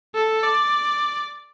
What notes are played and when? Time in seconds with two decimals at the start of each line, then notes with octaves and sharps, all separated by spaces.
0.15 A4
0.43 D5